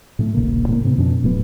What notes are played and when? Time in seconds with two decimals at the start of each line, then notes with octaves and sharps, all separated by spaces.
0.19 A2 G#3 A3
0.35 D#1 A#1 C#3 A#3
0.69 A2 C#3 A#3
0.83 G#2 C3 B3
0.98 F2 B2 C#4 D4
1.23 D1 A2 F#3 B3